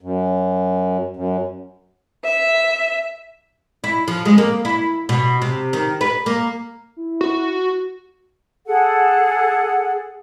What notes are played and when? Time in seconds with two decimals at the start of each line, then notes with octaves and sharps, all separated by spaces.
0.01 F#2
1.16 F#2
2.24 E5
3.84 E4
4.08 F3
4.25 G#3
4.38 A#3
4.65 E4
5.09 B2
5.42 C3
5.73 D#3
6.01 B4
6.26 A#3
6.97 E4
7.21 F#4
8.66 G#4 A4 F#5